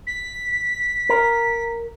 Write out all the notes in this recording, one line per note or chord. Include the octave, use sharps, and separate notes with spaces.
B6
A#4